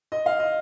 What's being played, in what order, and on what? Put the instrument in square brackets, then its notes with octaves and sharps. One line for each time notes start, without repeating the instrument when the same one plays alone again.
[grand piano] D#5
F5
D#5